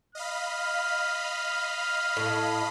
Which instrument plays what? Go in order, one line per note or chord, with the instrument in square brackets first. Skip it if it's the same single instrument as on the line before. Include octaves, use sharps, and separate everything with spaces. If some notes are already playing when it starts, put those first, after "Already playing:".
[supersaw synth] D#5 F5 B5 [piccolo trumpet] F6
[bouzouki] A2